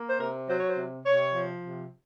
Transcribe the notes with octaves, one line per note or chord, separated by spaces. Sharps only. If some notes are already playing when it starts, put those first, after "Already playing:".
Already playing: A#3
C5
C3 A#4
F#3 C5
C#5
C5
C3
C3 C#5
F3
C3